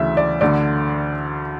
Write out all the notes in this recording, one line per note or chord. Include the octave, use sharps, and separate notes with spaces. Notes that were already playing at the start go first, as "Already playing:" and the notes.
Already playing: D2 C#3 E3 E5
D5
D2 D3 D5